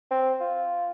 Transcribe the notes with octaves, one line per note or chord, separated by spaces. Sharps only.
C4
F4